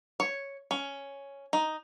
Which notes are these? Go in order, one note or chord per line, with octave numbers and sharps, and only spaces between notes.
C#5
C#4
D#4